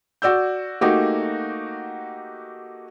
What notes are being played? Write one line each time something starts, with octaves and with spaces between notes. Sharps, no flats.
F#4 D5 E6 G6
A3 A#3 D#4 F#4 G4